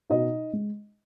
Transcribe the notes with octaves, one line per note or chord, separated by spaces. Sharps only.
B2 D#4 D#5
G#3